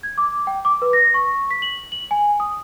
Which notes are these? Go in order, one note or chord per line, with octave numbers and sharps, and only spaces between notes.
G#6
D6
G5
D6
B4
A#6
C#6
B6
F#7
F#7
G#5
D#6